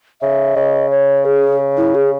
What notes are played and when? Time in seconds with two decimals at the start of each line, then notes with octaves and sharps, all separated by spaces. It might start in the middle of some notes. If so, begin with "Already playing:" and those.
0.21 C#3 E5
0.56 C#3 D#5
0.91 C#5
1.25 G#4
1.77 E4
1.95 G#4